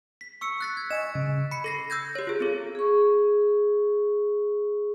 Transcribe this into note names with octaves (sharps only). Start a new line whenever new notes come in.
B6
C#6 E6 C#7
F#6 A6 B6
G#6
D#5 G#5 C#6 E7
C#3
B5 C#7
A4 A#6 C7
E6 G6 G#6 A#6
G4 C#5
F4 G#4
C4 A4
G#4 C#6